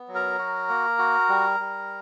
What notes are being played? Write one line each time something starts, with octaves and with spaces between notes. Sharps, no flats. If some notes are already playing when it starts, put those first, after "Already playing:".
Already playing: B3
F#3
A#4 A#5
F#4
A#3
F#4
G3
G3